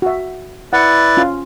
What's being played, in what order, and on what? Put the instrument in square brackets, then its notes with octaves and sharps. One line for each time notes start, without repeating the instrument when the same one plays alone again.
[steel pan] F#4 E5
[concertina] E4 B4 D5 [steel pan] F#5
[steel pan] C#4 F4